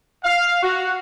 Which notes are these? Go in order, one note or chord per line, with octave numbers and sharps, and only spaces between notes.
F5
F#4